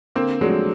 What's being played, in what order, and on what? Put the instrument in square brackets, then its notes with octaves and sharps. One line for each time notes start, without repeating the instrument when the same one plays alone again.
[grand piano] D3 [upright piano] A#3 C4
[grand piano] F3 A3 D4 F#4 [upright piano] F#3 G#3